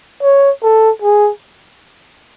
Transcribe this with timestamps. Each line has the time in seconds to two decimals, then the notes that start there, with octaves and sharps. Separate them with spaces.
0.23 C#5
0.63 A4
1.02 G#4